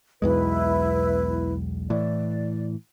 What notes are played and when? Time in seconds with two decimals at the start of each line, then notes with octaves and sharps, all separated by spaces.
0.22 B1 E2 G#3 E4 B4
1.90 A2 E3 D5